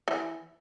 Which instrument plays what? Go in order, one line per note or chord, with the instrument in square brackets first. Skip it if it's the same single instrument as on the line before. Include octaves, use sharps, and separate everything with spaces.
[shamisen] E3